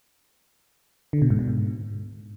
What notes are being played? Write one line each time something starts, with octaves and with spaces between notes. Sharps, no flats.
D3
B2
G#2
B2
G#2